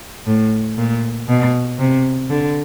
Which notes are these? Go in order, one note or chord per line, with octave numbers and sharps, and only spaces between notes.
A2
A#2
B2
C3
D3